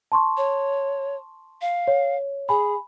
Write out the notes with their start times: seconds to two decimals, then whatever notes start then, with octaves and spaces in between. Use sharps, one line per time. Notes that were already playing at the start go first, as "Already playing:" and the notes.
0.12 A5 C6 C#6
0.37 C#5
1.61 F5
1.88 C#5
2.49 G#4 G#5 B5